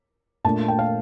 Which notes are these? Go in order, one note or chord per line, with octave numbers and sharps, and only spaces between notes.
A#2 A3 D4 A5
G5
F5